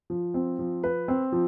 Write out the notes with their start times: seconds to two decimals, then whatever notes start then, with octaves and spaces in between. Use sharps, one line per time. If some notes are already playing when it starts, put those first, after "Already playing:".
0.10 F3
0.34 C4
0.59 F3
0.83 B4
1.08 C4
1.32 F3